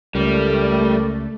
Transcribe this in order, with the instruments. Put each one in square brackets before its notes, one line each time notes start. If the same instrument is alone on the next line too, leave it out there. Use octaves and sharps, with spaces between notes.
[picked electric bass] C#2 [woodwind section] A2 A#4 D5 [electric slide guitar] G3 [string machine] A3